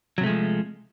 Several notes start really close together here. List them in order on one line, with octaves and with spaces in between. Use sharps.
F#3 C3 A3 G#3 F3